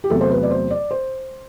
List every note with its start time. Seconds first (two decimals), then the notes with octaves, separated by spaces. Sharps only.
0.04 G4
0.10 E2 C3 F#3 A3 A4
0.21 C5
0.31 B4
0.43 D5
0.51 C5
0.70 D5
0.91 C5